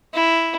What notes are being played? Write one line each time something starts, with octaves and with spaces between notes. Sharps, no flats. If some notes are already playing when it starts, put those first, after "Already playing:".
E4